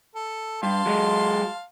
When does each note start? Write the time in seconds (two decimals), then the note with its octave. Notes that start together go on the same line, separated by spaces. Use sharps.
0.16 A4
0.63 G2 F5 A5 C6
0.86 F#3 G#3